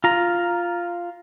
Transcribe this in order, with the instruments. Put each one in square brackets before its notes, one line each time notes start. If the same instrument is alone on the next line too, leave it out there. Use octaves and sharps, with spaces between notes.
[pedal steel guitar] F4 A#5